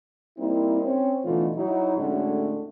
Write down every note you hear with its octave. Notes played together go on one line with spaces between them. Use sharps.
G3 A#3 C4 D#4 E4
C4 C#4
B2 D3 E3 A3 D#4 F4
F#3 D#4 E4
A2 D3 G#3 A3 C#4 F#4